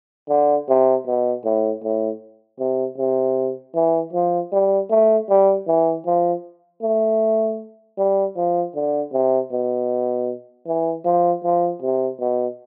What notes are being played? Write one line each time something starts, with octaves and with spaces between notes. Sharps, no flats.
D3
C3
B2
A2
A2
C3
C3
E3
F3
G3
A3
G3
E3
F3
A3
G3
F3
D3
C3
B2
E3
F3
F3
C3
B2